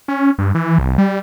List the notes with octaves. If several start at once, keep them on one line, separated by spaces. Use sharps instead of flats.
C#4
G2
E3
C2
G3